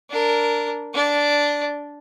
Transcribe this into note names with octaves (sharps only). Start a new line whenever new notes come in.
D4 A#4
D4 D5